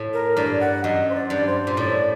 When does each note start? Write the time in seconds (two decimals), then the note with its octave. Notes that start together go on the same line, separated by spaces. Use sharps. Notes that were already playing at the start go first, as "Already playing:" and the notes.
Already playing: A2
0.14 A#4
0.37 G2 D5
0.61 F#5
0.84 F#2 D#5
1.10 C5
1.15 D5
1.30 G2
1.46 C5
1.67 A#2
1.77 A2 D5